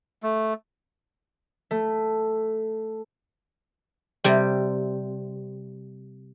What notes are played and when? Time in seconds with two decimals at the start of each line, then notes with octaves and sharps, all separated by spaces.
0.23 A3
1.71 A3
4.24 C3 G3